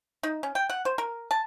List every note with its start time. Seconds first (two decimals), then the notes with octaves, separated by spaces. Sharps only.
0.23 D#4
0.43 C#4
0.55 G5
0.70 F#5
0.85 C5
0.98 A#4
1.31 A5